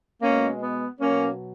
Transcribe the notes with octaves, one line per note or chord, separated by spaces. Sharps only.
B2 G#3 A#3 C#4
B3
B2 F#3 A#3 C#4